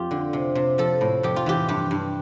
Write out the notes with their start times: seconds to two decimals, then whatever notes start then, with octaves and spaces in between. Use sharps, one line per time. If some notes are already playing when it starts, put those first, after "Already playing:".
Already playing: F2 F4 G4
0.11 D3
0.33 C3
0.55 C3
0.78 F3 A4
1.01 A2
1.23 F2 G4
1.36 F4
1.46 E3 G4
1.69 G2 G4
1.91 G2